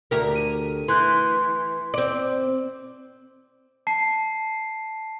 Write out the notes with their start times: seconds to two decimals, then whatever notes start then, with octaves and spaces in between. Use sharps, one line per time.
0.11 D2 G4 A#4
0.36 D#7
0.88 E3 C6 F#6 G6
1.94 C4 D5
3.87 A5 C7